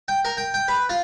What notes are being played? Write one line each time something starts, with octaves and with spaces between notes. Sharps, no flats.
G5
A#4
G5
G5
B4
F4